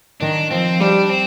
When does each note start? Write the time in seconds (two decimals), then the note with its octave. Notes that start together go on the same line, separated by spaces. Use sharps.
0.21 D#3 D4
0.50 F3 C4
0.80 G3 D4
1.09 C4